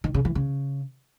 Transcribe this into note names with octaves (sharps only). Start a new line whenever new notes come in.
D#3
C#3
E3
C#3